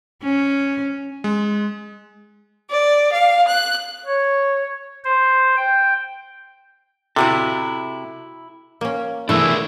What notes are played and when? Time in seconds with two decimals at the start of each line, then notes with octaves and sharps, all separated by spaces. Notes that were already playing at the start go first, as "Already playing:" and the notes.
0.23 C#4
1.24 G#3
2.69 D5
3.12 F5
3.46 F#6
4.06 C#5
5.04 C5
5.57 G5
7.16 C3 E4 F#4 A4
8.81 A#3 C#4
9.29 C3 E3 A3 B3 D4 E4 G#4 A#4